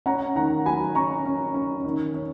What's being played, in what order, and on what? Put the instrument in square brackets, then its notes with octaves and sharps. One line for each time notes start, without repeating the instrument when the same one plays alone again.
[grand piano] C#4 F#5 A#5
D#3 F#5 A#5
F#3 G#5 B5
C#4 A#5 C#6
C#4
C#4
D#3
C#4